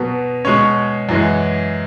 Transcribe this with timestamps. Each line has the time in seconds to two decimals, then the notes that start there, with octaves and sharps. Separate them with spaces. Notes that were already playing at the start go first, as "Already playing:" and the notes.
Already playing: B2 F#3 B3
0.45 B2 G#3 C#4 C#5
1.09 F#2 E3 G#3